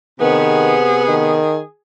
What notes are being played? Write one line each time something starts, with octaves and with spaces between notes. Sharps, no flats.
C3 D#3 B3 G#4
D#3